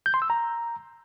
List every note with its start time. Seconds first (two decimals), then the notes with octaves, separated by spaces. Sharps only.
0.06 G6
0.14 C6
0.22 E6
0.30 A#5